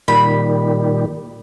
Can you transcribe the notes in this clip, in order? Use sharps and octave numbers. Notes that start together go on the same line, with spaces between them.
A#2 D#3 G3 B5